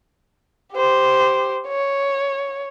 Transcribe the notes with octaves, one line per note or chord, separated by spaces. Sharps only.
G4 C5
C#5